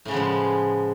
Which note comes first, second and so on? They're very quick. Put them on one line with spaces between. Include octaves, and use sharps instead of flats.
A2 C#3 B3 F3 G#3